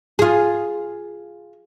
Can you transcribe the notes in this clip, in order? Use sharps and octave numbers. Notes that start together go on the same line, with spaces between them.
F4 G#4